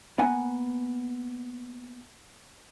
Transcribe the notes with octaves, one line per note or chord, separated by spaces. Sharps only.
A#3 B3 F#5 G#5